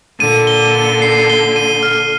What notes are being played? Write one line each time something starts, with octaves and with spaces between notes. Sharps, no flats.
A#2 D3 D#7
G7
D#7
C7
G7
D#7
F6